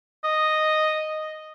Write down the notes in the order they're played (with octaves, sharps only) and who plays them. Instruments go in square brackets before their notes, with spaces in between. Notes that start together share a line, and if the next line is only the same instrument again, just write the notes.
[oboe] D#5